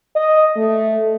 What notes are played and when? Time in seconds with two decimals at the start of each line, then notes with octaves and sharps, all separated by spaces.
0.16 D#5
0.56 A3